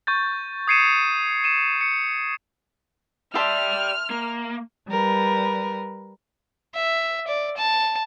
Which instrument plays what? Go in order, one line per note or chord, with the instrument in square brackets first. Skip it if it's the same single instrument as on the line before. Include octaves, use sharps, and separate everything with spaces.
[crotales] C#6 G6 A6
D#6 G#6 C7 C#7 D#7 E7
D#7 E7
C#7
[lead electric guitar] G4 D5 [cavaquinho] E5 A5 C6 [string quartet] F6
[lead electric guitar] A#3
[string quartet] G3 A#4 B4
[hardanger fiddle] E5
D5
A5